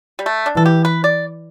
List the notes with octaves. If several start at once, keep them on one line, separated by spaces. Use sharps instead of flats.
G3
A3
D4
E3 A4
G4
B4
D5